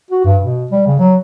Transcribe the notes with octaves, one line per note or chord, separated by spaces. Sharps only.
F#4
G2
B2
G3
C#3
F#3